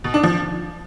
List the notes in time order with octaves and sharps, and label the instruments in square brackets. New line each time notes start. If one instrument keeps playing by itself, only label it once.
[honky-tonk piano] B2
D4
F3